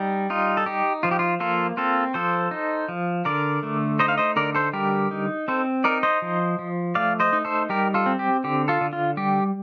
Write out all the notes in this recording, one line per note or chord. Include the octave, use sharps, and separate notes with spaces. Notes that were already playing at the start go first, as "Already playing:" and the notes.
Already playing: G3 D#4
D#4 F4
A4
D#4 G4
F3 F4
G4
F4
A#3 F4 A4
C4 F4 A4
F3 A4 C5
D#4
F3
D3 A#4 D5
A3
D#4 C5 D#5
F5
C5 D#5
D3 A#4 D5
A4 C5
G3 G4 A#4
D#4
C4 A4 C5
D#4 A#4 D5
C5 D#5
F3
F3
A3 D5 F5
C5 D#5
D#4
A4 C5
G3 G4 A#4
F4 A4
C4
G4
D3 G4
F4 A4
D3
F4
G3 G4